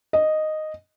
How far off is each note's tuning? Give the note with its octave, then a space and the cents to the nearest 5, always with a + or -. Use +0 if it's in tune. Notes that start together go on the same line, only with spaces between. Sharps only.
D#5 -5